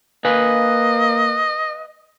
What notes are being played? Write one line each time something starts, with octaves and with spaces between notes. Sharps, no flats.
A#3 B4 D#5 F5 G#5